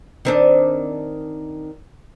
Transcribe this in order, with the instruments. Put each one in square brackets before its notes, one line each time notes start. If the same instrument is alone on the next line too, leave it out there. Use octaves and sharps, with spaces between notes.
[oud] D#3 C4 D4